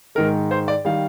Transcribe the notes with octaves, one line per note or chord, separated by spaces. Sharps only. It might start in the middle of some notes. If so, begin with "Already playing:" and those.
G#2 D#3 G#3 A#4
C5
D5
D#3 G3 F5